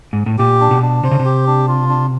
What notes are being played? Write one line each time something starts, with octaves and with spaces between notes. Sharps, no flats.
G#2
A2
A#2 G4
D4
B2
D4
C3 C5
C#3
C3
G4
D4
F4
D4